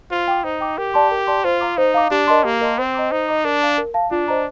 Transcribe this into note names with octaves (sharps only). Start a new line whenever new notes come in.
F4 C5
G5 D6
D#4 C5
G5 D6
G4 A#4
D5 A5 C6
A#4
D5 A5 C6
F4 C5
F5 A#5 D6
D#4 C5
F5 A#5 D6
D4 G4
A#4 D#5 A5 C6
A#3 G4
A#4 D#5 A5 C6
C4 C5
D#5 A#5 D6
D#4 C5
D#5 A#5 D6
D4 A#4
F5 A5
A#4
F5 A5
D4 F4
C5 D#5 A#5